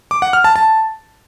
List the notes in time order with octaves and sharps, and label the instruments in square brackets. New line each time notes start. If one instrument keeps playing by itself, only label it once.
[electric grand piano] D6
F#5
F6
A5
A5